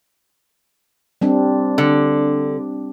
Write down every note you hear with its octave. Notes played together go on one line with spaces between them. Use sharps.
G3 C4 D4
D3